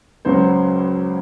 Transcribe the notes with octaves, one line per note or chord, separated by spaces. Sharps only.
C#2 C#3 F#3 C#4 C5